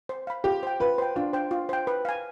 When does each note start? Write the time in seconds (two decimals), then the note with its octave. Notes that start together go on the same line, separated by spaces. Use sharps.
0.09 C5
0.27 F5 B5
0.44 F4 G4
0.63 C5 G5
0.80 F4 B4
0.98 C5 G5
1.16 D4 F4
1.33 C5 G5
1.51 F4
1.69 C5 G5
1.87 B4
2.05 F5 G#5